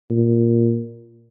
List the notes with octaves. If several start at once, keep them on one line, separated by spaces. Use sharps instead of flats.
A#2